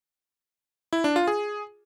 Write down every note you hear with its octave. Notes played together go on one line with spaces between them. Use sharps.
E4
D4
F4
G#4